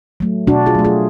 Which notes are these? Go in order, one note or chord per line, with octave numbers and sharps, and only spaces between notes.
F#3 A3
B2 D4 F#4
F4 G#4
F#3 A3
F4 G#4